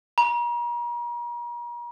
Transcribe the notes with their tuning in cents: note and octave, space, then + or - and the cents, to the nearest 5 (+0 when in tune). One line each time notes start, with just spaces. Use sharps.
A#5 +40